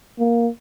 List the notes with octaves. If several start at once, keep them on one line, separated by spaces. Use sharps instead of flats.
A#3